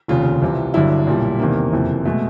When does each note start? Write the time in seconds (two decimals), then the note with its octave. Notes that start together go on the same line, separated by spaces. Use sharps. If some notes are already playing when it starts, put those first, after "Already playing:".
0.08 F1 D#2 C#3 F4
0.42 C2 C3 E3
0.74 G1 G2 D3 F#3 E4
1.07 B1 A#2 G3
1.40 E2 C3 D#3 A#3
1.72 F#1 F2 C3 E3
2.05 B2 G#3 A3